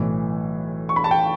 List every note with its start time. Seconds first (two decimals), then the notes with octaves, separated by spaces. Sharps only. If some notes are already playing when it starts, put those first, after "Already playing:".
Already playing: B1 A2 E3
0.89 C#6
0.96 B5
1.04 A5
1.11 G5